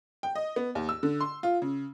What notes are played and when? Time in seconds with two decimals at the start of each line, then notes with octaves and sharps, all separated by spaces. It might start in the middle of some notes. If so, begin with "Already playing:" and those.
0.23 G5
0.35 D#5
0.56 B3
0.75 D#2
0.89 E6
1.03 D3
1.21 C6
1.43 F4
1.62 C#3